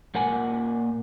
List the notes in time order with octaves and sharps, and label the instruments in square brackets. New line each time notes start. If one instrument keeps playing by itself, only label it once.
[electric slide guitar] A#2 A#3 F#5 G#5